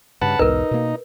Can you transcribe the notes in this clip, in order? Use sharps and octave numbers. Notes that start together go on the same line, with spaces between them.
G2 C#3 B4 F#5 A5
B1 E2 G#2 D#4 A#4 B4
B2 A#3